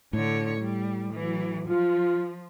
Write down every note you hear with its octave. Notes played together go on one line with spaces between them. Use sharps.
A2 D3 C#5
G3
E3 F#3
F3 F4